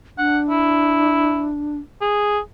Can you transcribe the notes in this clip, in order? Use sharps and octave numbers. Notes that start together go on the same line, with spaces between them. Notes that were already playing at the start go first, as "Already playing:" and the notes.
D4 F#5
E4
G#4